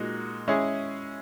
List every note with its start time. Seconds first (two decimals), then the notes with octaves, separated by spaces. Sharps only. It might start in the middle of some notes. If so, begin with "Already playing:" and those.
Already playing: A#2 G#3 D#4 F#4
0.48 G#3 C#4 E4 G#4